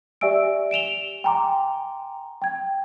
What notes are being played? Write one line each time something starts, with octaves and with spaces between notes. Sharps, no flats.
G4 D5 E5 G#5 E6 D7
D7 E7 F7 G7
G5 G#5 A#5 C6 D6
G5 G#6